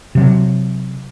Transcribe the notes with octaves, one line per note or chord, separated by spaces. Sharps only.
C3 F#3